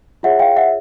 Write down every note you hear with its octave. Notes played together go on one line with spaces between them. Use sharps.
F4 G#4 C#5 E5 F#5
F5 G5
E5 F#5